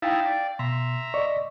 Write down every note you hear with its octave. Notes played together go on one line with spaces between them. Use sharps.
D#4 E4 F5 G5 A5
D5
B2 E5 A#5 C6
D5 D#5 C#6